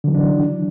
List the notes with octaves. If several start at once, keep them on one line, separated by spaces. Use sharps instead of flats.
D3 E3 F#3 D4